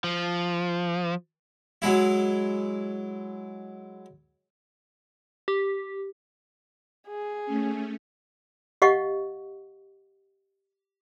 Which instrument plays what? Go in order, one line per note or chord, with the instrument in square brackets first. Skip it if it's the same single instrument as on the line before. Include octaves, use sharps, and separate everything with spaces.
[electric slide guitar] F3
[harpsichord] F#3 G#3 E4
[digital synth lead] G4
[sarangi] G#4
[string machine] A3 C#4
[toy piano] G4 D#5 F5 F#5 C#6